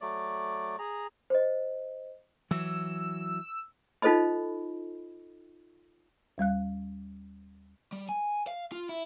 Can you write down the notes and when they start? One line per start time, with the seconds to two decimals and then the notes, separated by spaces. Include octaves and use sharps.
0.01 F#3 A3 D5
0.79 G#4 A#5
1.30 C5 D#5
2.51 E3 F#3 E6
4.02 D#4 F4 A4 C5 D#5 B5
6.38 D#2 G3 F5 F#6
7.92 G3
8.09 G#5
8.47 F5
8.72 F4
8.89 E4